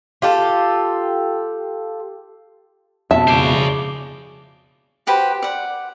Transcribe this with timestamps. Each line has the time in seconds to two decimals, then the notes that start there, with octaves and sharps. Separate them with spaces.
0.22 F4 G4 A4
3.11 F2 B2 E5 A5
3.27 C#3 C5 D5
5.07 F#4 G4 B4 C5
5.42 D5 F#5